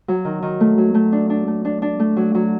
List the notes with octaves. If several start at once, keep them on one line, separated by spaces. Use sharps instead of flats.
F#3
D#3
D#3
A3
F#3
A3
D4
D4
A3
D4
D4
A3
F#3
F#3